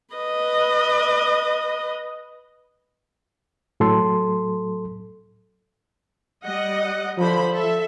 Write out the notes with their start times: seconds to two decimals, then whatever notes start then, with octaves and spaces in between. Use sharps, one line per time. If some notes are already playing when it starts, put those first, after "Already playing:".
0.15 B4 D#5
3.80 A2 F#3 A4 C6
6.43 G3 D#5 F#5
7.18 D3 F3 C5 B5
7.52 A4 E5